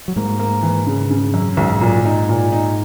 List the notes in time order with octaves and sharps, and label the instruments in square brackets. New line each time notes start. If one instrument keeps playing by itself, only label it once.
[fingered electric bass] F#3
[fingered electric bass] G#2 G#3 [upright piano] A#3
[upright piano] A#3
E3
C#3
C#3
F#2
[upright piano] B1 [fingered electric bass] G#2 G#3
[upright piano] A#2
D#4
A#2
D#4